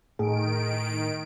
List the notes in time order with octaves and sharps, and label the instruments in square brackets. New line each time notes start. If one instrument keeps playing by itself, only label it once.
[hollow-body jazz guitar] A2 [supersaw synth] D#3 D7 [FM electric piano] G#4